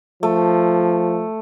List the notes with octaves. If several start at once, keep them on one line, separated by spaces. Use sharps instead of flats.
F3 A3